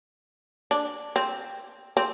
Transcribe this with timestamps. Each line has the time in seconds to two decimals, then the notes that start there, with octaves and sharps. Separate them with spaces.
0.71 D4
1.16 C4
1.97 C4